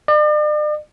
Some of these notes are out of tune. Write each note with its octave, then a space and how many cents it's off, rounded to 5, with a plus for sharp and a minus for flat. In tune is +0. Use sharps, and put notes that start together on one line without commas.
D5 +40